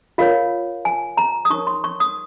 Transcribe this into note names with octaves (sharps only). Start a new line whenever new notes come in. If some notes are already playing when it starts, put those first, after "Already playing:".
F4 A#4 C#5 F5
G#5
A#5
D#6
D#4 A#4 C#5 C#6
C6
C#6
D#6